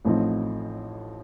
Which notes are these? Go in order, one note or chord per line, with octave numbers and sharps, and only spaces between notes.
A1 A2 F3 C4 D#4